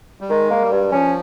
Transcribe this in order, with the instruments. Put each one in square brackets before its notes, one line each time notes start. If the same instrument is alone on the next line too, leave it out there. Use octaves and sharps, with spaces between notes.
[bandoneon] G3
[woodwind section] D#3 [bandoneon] G#3
[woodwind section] A#3
[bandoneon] G3
[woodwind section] G2
[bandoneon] F3 [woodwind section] C#4